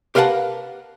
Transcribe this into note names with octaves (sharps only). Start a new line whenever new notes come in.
G4 A#4 B4 F5 F#5 A5